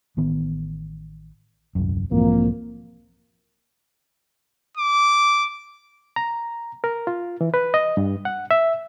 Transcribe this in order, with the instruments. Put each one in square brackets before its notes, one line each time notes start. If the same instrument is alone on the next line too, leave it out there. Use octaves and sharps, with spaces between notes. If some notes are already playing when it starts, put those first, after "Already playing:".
[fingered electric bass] A1 D#3 B3
D#1 C2 F#2
[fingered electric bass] B1 G#2 E3 [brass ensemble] F2 A#3
[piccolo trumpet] D6
[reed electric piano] A#5
A#4
F4
E3
B4
D#5
G2
F#5
E5